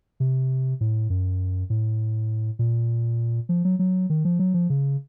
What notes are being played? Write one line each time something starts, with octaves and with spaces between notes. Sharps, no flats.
C3
A2
F#2
A2
A#2
F3
F#3
F#3
D#3
F3
F#3
F3
C#3